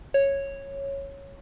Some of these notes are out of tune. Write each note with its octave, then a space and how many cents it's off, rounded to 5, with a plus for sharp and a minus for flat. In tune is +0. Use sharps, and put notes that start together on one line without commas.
C#5 -5